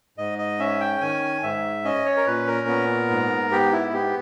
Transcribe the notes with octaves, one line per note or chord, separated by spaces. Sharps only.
G#2 D#5
D#5
C#4 E5
G5
D#3 G#5
G#2 E5
C#4 D#5
C#5
A#4
A#2 B4
A#4
B3
G#2
B3 G4
E4
B3 G4